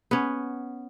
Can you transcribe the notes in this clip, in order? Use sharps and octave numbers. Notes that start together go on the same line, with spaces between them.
B3 C#4